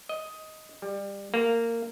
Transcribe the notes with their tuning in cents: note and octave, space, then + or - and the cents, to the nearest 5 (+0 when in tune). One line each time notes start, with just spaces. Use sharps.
D#5 +10
G3 +25
A#3 -15